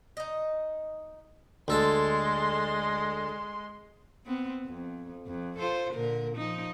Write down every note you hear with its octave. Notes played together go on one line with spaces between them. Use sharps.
D#4 D#5
D2 G#3 A4 A5 C6
B3 C4
F2
F2
F4 A4 C5
A#2 D3 A#4
F3 D#4